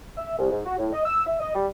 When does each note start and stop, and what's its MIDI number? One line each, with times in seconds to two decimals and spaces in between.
0.17 0.37 76
0.39 0.49 36
0.51 0.60 44
0.65 0.74 66
0.78 0.88 45
0.92 1.05 75
1.05 1.21 88
1.26 1.38 76
1.40 1.54 75
1.54 1.67 55